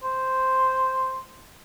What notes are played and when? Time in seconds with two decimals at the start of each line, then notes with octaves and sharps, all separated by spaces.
0.03 C5